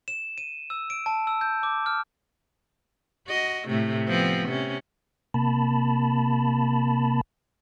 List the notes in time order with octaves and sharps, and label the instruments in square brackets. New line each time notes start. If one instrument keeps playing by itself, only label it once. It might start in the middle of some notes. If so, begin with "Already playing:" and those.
[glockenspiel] E7
D#7
E6
D7
A5
E6
G6
D6
F6
[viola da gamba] F#4 D#5
A2 C3 A3
F3 B3 C4
C3 C#4
[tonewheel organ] C3 A#3 A5 B5